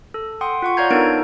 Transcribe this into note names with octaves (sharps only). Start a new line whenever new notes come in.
A4
F#5 G5 C6 D#6
F4 F#5 C#6
C#5 D5 F5 A#5 G6 G#6
B3 D4 D#4 A4 A#4 D7